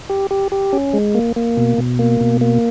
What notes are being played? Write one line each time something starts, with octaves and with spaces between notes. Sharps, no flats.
G4
G4
G4
C#4
G#3
A#3
A#3
B2
B2
A#3
B2
A#3